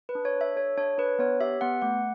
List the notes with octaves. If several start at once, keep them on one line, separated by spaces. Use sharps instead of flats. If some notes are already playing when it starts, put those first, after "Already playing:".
B4
D4
C#5
D4
E5
A4 C#5
D4 C#5
D4 B4
B3 C#5
G4 E5
B3 F#5
A3 F#5